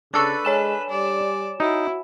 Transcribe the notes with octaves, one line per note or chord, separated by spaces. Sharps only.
C#3 D4 A4 B4 C#6 E6 A6
G#3 C#5 G#5 E7
G3 D5
D#4 E4 F#4